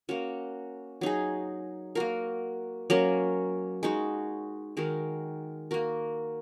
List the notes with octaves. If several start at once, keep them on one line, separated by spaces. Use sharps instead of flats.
A#3 C#4 F#4
F#3 D#4 G#4
A#3 F#4 A#4
F#3 A#3 C#4 A#4
G#3 D#4 F#4
D#3 G#3 F#4 A#4
A#3 F#4 A#4